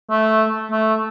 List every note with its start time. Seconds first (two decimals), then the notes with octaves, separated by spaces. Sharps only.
0.10 A3
0.71 A3